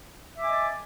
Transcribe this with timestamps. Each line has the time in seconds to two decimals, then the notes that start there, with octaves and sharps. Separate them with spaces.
0.35 E5
0.39 D6
0.43 G#5
0.47 D#5
0.51 A5